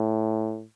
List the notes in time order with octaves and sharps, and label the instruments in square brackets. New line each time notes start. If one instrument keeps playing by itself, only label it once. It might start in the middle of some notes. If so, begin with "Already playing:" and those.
Already playing: [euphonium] A2